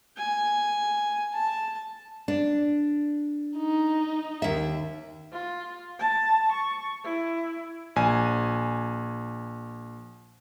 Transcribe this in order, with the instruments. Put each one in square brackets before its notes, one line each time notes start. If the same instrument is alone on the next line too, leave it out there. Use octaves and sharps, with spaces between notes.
[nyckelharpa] G#5
A5
[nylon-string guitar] D4
[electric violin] D#4
[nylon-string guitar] D#2 E5
[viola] F4
A5
C#6
E4
[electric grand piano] A#1 G#5